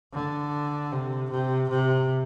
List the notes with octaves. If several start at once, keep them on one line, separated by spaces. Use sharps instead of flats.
D3
C3
C3
C3